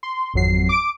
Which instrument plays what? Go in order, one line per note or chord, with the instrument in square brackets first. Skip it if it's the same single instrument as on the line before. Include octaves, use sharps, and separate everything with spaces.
[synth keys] C6
G#1 F2 F#3 C7
D6 D7